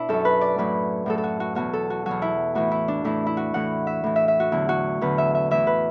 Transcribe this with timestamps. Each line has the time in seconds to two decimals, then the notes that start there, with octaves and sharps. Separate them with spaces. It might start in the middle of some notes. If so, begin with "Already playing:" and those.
Already playing: B2 D4 E4
0.09 F#2 F#3 A4
0.25 B4
0.41 D5
0.58 A2 F#3 B4
1.06 A2 F#3 A4
1.18 A4
1.24 F#4
1.40 F#4
1.55 E2 B2 F#3 F#4
1.73 A4
1.90 F#4
2.06 E2 B2 F#3 F#4
2.22 E4
2.55 A2 E3 F#4
2.71 E4
2.88 D4
3.04 A2 E3 E4
3.26 E4
3.37 F#4
3.54 A2 E3 F#5
3.87 E5
4.04 A2 E3
4.16 E5
4.28 E5
4.40 F#4
4.52 E2 D3 F#3 E4
4.69 F#4
5.01 E2 D3 F#3 B4
5.18 E5
5.35 E5
5.51 A2 E3 E5
5.67 B4